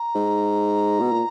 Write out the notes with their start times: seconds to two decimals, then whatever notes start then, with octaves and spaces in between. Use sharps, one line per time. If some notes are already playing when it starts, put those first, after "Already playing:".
Already playing: A#5
0.15 G#2
1.00 B2
1.12 A#2